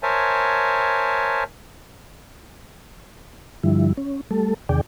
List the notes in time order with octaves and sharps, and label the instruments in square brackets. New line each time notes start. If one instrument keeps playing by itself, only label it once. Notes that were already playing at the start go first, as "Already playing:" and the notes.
[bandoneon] A#4 C5 C#5 E5 G#5 A5
[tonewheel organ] G2 D3 F3 G3 E4
C#4
G3 A3 A4
E2 C3 D#3 G#4 D5 G5